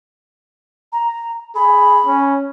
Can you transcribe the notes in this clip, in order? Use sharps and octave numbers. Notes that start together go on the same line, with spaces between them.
A#5
G#4 B5
C#4